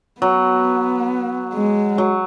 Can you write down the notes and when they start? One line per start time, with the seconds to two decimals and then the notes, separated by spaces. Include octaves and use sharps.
0.21 F#3 B3
1.54 G#3
1.98 F#3